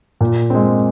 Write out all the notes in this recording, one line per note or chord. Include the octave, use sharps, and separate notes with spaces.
A#2
G#3 C4